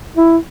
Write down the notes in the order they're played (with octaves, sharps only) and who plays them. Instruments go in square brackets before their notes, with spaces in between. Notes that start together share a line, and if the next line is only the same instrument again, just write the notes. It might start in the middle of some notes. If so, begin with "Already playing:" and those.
[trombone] E4